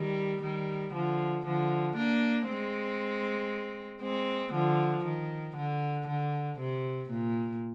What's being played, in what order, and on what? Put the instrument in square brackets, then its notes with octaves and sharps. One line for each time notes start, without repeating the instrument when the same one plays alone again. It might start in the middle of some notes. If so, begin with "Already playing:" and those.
Already playing: [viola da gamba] D#3 G3
D#3 G3
D3 F3
D3 F3
A#3 D4
G#3 C4
G#3 C4
D3 F3
D#3
D3
D3
C3
A#2